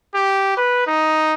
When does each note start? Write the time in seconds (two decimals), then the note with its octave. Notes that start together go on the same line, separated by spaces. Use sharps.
0.15 G4
0.57 B4
0.87 D#4